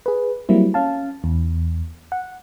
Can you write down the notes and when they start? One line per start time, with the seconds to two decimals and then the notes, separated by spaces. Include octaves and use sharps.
0.06 G#4 B4
0.49 F#3 G3 A#3 C4 E4
0.74 C#4 F5 A5
1.24 E2
2.12 F#5